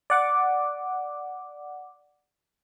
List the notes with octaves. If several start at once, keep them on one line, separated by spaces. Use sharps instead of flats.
D5 F#5 D6